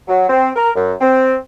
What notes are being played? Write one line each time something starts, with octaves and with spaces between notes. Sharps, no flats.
F#3
C4
A#4
F#2
C4